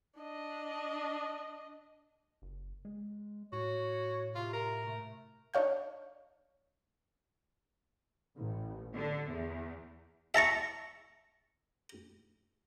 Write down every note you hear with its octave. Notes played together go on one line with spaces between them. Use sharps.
D4 D#5
F#1
G#3
A2 F#4 C#5
C3 F4
A#4
A3
D4 D#4 C#5 F5 G6
A1
D3
E2
E5 A5 A#5 C#6